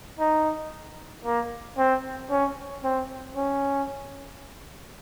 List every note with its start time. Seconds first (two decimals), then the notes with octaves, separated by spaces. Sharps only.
0.19 D#4
1.25 A#3
1.78 C4
2.31 C#4
2.84 C4
3.36 C#4